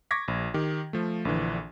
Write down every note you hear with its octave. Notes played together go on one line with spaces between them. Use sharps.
C#6 D6 G#6 A#6 B6
A#1
D#3 G4
F3 A3
A#1 D3 E3